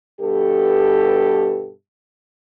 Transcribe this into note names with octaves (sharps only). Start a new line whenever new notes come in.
G2 B2 G4 A4